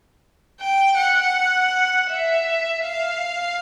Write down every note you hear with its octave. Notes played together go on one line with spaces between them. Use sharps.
G5
F#5
E5
F5